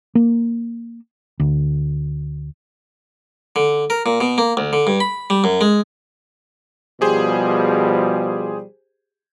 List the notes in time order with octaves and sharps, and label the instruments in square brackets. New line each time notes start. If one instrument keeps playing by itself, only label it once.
[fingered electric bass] A#3
D2
[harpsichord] D3
A#4
A#2
B2
A#3
D2
D3
G2
B5
G3
F#2
G#3
[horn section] B2 F3 G3 [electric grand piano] G4 G#4 C5